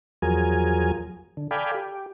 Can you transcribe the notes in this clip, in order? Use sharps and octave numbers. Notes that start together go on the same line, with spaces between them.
E2 F3 F#3 G#4 A#4 G#5
D3
A4 D5 F5 G5 G#5 B5
G4